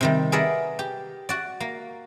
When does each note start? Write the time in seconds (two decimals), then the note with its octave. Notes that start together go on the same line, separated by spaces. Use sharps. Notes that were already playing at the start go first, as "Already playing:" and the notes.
0.01 C3 D#3 G3
0.32 G#4 A#4 B4 D5 E5 F#5
0.79 G4
1.29 F#4 D5
1.60 A#3